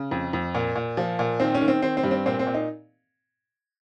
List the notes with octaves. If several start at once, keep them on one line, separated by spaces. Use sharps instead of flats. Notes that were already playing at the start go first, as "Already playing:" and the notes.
Already playing: C#3
F2
F2
A#2
A#2
F3
A#2
D#3 C4
C#4
D#3
C4
D#3 C4
C4
G2
C4
A#2 C4
C4
A#2
D#4